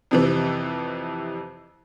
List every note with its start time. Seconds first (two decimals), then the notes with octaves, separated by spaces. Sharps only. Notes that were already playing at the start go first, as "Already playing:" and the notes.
0.11 F2 C3 E3